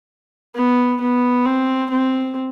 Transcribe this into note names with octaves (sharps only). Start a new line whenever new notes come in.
B3
B3
C4
C4